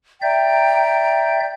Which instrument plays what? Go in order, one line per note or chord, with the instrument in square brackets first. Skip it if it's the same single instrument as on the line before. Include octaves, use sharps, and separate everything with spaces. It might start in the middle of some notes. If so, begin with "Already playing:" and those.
[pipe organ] D5 E5 G6 [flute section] G5 A#5